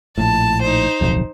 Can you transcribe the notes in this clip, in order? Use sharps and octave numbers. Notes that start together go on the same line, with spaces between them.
A#1 A2 A5
D#4 C5
D1 B1 F2